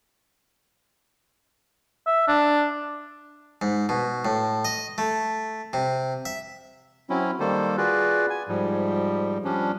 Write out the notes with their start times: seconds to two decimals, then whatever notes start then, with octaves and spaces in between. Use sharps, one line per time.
2.07 E5
2.28 D4
3.62 G#2
3.89 B2
4.25 A2
4.65 D#5
4.98 A3
5.73 C3
6.25 E5
7.10 F#3 C4 C#4 E4
7.40 D#3 G3 A#3 A4 C5
7.77 F4 F#4 G#4 B4 D5
8.30 G#5
8.48 G#2 F3 G3
9.44 F3 G3 C#4 D4